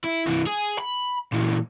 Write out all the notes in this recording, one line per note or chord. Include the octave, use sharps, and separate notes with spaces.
E4
C2 E3
G#4
B5
A#2 E3